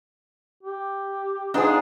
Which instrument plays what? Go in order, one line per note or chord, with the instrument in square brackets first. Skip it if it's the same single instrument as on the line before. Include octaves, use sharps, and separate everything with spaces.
[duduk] G4
[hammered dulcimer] F3 B3 D#4 [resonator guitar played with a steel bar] D4 G#4